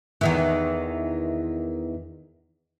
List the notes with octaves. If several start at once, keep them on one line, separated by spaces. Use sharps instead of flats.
E2 D#3 E3